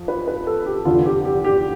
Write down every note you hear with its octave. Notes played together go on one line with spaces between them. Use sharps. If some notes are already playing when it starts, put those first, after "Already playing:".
Already playing: F2
B4
B4
A4
G4
F1 E2 D3 F4
G4
G4
G4